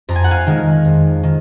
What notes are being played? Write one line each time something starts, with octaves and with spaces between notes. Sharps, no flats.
F2 A#5
G#5
F#5
F5 G#5
D#3 G#3
F2
D#3